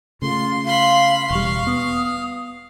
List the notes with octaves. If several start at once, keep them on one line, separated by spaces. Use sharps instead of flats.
C#3 A3 F4 C6
F5 B5 C6
E1 G3 F5 C#6
B3 D#6